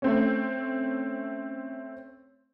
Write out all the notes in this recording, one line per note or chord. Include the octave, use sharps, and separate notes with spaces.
A3 C4 C#4